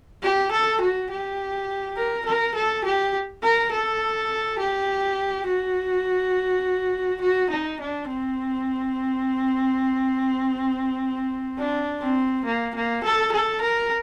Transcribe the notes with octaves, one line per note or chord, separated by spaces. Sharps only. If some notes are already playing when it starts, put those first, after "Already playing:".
G4
A4
F#4
G4
A#4
A#4
A4
G4
A#4
A4
G4
F#4
F#4
D#4
D4
C4
D4
C4
A#3
A#3
A4
A4
A#4